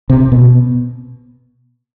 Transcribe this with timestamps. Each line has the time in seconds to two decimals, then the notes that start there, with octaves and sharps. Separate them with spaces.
0.10 C3
0.32 B2